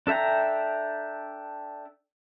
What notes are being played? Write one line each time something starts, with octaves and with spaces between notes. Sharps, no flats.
D4 A4 E5 G5 A#5